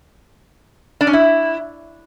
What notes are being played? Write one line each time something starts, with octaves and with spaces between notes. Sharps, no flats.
D4
C#4
E4